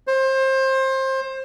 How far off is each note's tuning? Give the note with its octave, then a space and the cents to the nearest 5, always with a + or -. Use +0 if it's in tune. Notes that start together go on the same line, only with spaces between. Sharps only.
C5 +25